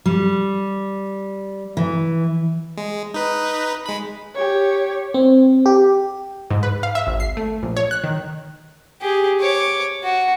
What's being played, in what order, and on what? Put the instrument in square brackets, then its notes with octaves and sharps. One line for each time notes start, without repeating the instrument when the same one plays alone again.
[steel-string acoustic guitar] G3
E3
[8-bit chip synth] G#3
D#4 B4
G#3 B5
[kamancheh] G4 C#5
[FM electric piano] C4
G4
[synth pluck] G#2
B4
F5
E5
G#1
C7
A3
A#1
C#5
F#6
D#3
[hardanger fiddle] G4 G#4
C#5 D6
F#4